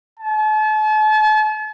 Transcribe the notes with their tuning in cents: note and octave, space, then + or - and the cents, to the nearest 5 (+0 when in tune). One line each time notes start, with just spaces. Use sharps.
A5 -40